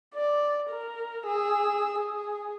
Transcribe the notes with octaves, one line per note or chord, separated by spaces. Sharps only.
D5
A#4
G#4 E6
G#4